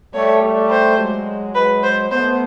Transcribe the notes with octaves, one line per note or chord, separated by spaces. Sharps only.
G3 A3 C#5
G3 A3
C5
F#3 G#3
F#3 G#3 B4
C5
A3 B3 C5